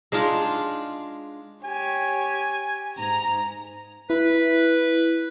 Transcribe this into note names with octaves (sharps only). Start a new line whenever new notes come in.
G#3 D4 D#4 F4
G4 C#5 G#5
G#2 A#5
E4 B4